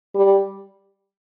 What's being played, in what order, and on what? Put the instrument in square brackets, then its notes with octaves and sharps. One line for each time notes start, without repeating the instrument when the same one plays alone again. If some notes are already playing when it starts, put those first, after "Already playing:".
[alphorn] G3